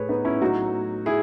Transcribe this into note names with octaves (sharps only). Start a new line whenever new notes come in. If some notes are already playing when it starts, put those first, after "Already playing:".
Already playing: A2 G#4 B4 C#5
B3 D#4
C#4 E4
A2 F#3 D#4 F#4
E4 G#4